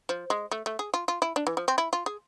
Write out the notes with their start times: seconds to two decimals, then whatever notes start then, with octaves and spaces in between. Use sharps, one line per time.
0.09 F3
0.30 G#3
0.51 A3
0.66 A3
0.79 G#4
0.94 F4
1.08 F4
1.22 E4
1.36 D4
1.47 E3
1.57 F3
1.68 C4
1.78 E4
1.93 F4
2.06 G#4